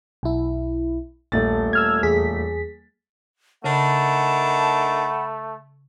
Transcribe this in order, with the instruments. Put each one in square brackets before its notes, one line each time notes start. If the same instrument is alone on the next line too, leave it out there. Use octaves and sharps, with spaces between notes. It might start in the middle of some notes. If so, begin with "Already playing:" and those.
[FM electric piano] B1 E4
[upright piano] D#1 A3 A6 [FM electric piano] A#1
[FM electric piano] E6 F6 G#6
E2 G#4 B6
[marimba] C#3 [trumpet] A3 [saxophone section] D4 D#4 A#4 [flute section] F#5 A5 B5